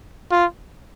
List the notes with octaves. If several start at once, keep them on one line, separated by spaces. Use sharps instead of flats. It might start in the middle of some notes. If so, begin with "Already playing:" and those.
F4